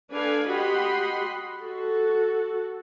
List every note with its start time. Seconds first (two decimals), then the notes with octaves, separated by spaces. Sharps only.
0.12 D4 A4 B4 F5 G#5
0.50 F#4 G4 D#5 F#5 B5 C6
1.60 F#4 A4